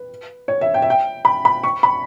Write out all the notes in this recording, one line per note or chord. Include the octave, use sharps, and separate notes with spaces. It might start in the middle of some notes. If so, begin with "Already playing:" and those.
Already playing: B4
C#5
E5
G5
E5
G5
B5
B5
C#6
B5